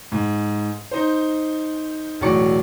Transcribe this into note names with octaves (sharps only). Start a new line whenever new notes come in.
G#2
D#4 C5
E1 A2 F#3 D5 C#6 C#7